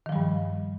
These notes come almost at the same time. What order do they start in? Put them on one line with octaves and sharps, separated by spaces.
D#3 F3 G3 G2